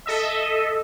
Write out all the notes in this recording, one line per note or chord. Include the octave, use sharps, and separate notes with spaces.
A4 D#5 E5